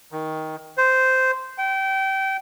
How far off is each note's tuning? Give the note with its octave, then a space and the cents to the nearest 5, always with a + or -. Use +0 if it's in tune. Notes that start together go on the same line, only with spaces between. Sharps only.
D#3 +15
C5 -10
G5 -25